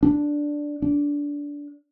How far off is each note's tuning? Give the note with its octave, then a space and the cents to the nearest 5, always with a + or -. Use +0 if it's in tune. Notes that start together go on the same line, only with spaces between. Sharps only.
D4 +0
D4 -20